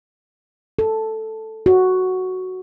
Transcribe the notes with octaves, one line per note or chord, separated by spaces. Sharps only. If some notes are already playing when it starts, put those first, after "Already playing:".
A4
F#4